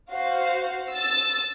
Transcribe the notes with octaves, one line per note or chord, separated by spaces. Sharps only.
F#4 C5 F5
E6 A6